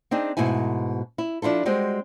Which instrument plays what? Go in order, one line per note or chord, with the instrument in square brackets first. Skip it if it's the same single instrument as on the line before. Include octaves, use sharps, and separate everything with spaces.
[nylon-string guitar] C4 D4 D#4 G#4
G#2 B2 A3 E4 G#5
E4
F3 D4 E4 F4 A4
G3 G#3 C4 F#4